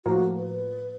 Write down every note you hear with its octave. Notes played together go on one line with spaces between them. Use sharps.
A2 F3 A#3 F#4
B4